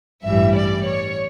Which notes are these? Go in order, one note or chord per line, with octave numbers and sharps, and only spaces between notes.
A1 G2 E3 G3 E5
D5
C#5